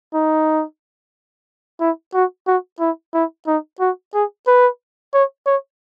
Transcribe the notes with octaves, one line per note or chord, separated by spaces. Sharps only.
D#4
E4
F#4
F#4
E4
E4
D#4
F#4
G#4
B4
C#5
C#5